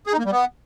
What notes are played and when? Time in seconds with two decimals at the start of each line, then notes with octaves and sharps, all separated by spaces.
0.07 G#4
0.13 D#4
0.19 A#3
0.25 G3
0.32 B3